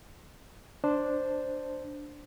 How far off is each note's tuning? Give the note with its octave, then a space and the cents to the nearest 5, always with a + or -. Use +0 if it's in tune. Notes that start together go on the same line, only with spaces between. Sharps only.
D4 +0 C5 +0